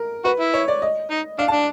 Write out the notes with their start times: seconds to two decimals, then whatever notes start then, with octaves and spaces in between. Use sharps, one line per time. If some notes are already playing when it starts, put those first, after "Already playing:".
Already playing: A#4
0.25 F#4 B4
0.40 E4
0.54 C#5
0.68 D5
0.82 D#5
1.11 D#4
1.39 D4 F5
1.48 A5
1.53 D4